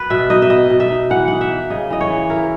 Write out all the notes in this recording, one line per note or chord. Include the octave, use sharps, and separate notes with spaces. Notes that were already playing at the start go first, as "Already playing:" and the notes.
Already playing: B3 B4
B2 E5
D#4 D#5
E5
B3 D#5
B2
E5
D#4
E3 F#5
D#4 F#5
E5
A#3
C#3 D#5
E3 D#5
C#5
E3
E4 A#4